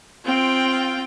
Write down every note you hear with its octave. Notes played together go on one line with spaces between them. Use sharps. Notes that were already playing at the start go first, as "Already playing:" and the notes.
C4 F4 G5